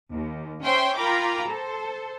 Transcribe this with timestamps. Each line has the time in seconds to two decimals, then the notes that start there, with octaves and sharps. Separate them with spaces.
0.11 D#2
0.63 C#4 C5 C#5 E5 G5 C6
0.97 F4 A#4 G5 A#5 B5 D6
1.49 A4 C5